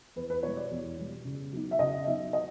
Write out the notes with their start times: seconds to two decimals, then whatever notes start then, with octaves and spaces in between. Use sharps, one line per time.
0.16 E2 B4
0.30 B4
0.43 B2 G3 C#5
0.57 D5
0.71 E2
0.98 B2 G3
1.25 C#3
1.53 F#3 B3 D#4
1.71 E5
1.79 C#3 D#5
2.06 F#3 B3 D#4 E5
2.33 D#5